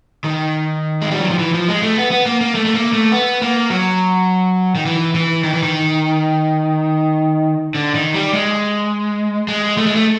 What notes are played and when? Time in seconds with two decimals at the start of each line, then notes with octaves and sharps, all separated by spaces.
0.24 D#3
1.02 G#3
1.11 G3
1.20 F#3
1.30 F3
1.39 E3
1.54 F3
1.69 G#3
1.83 A3
1.98 B3
2.11 B3
2.26 A#3
2.41 A#3
2.55 A3
2.65 A3
2.75 A#3
2.93 A3
3.12 B3
3.42 A#3
3.70 F#3
4.75 D#3
4.86 E3
5.15 E3
5.44 D#3
5.53 E3
5.63 D#3
7.75 D3
7.95 D#3
8.14 G3
8.33 G#3
9.48 G#3
9.77 A3
9.86 G#3
9.96 A3